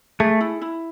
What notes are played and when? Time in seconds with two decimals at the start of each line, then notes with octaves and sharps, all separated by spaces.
0.20 A3 G#4
0.41 E4
0.62 E4